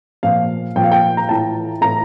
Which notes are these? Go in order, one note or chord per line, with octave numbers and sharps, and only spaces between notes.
A#2 F3 F5
A#2 F3 G5
F5
G5
A#5
A2 E3 A5
A2 E3 A#5